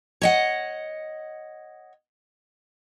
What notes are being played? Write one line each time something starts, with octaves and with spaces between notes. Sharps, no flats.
C#5 D#5 F#5